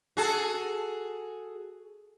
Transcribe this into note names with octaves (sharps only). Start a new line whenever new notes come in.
F#4 G#4 A4